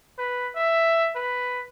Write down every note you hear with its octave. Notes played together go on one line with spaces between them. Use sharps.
B4
E5
B4